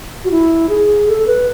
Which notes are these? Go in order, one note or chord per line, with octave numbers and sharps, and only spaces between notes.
F#4
E4
G#4
A4
B4